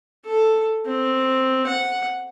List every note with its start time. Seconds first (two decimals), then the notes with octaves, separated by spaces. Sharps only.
0.25 A4
0.86 C4
1.66 F#5